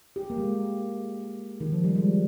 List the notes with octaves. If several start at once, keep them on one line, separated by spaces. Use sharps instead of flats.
G4
A#3
G#3
D#3
F3
G3
G#3